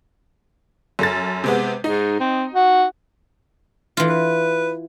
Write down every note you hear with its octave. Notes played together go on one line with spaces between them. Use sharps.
F#2 A4 A6
C3 G#3 B3
G#2 D#4
C4
F#4
E3 F4
B4